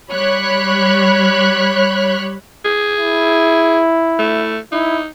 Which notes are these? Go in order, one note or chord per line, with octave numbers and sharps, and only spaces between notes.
G3 C#5 B5 F#6
G#4
E4
A3
D#4 E4